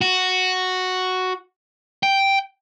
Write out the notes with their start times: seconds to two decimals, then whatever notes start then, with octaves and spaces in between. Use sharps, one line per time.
0.01 F#4
2.03 G5